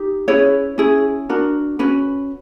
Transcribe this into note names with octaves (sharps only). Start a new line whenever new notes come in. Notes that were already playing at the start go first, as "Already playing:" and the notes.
Already playing: D#4 G4
C#4 E4 G#4 B4 C#5
C#4 E4 G#4
D4 F#4 A#4
C#4 F#4 B4